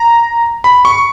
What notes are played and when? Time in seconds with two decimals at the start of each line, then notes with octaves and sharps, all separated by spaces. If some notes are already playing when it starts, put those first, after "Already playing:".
Already playing: A#5
0.64 B5
0.85 C#6